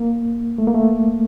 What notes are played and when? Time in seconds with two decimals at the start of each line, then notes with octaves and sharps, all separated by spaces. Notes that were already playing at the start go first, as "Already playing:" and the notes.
Already playing: A#3
0.58 A3
0.67 A#3
0.74 A3